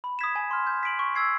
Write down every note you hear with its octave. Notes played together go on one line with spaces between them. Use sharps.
B5
D#6 G#6 B6 E7
G#5
C6 F6
G6
B6 D7 F#7
C#6
E6 G#6 C7